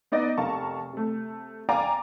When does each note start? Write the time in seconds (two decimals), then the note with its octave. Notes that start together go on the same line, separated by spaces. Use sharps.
0.12 B3 D#4 D5 D#5
0.37 F1 A#4 F5 A5 C#6
0.93 C3 A3
1.69 D5 F5 G5 G#5 A#5 D6